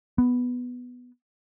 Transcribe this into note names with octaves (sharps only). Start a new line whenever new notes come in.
B3